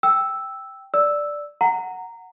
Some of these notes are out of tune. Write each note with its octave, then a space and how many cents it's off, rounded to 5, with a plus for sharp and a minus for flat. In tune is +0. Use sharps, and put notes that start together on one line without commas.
G5 +0 E6 +0
D5 +0 E6 +0
F#5 +0 A#5 -15